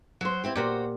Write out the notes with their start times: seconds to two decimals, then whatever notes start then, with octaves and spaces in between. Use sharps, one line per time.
0.21 F#3 C5
0.44 C4 E4 G4
0.56 A#2 F#4 G4 C5 C#5